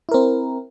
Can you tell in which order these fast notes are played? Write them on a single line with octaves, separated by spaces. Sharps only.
E4 A#4 C4